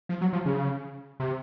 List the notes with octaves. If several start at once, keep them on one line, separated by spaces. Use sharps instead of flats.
F3
F#3
F3
C#3
C3